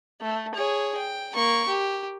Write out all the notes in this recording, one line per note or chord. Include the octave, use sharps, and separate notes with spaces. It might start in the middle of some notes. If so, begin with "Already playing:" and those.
A3
G#4 C#5
G5
A#3 C#6
G4